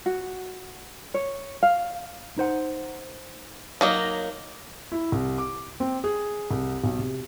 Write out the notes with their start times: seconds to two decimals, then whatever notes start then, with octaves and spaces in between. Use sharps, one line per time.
0.06 F#4
1.14 C#5
1.63 F5
2.38 D#4 C5 F#5
3.81 F#3 A#3 D#4
4.92 E4
5.12 C2
5.38 D6
5.80 C4
6.04 G#4
6.51 C2
6.84 B1
6.99 C3